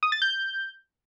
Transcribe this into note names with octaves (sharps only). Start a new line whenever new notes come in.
D#6
A6
G6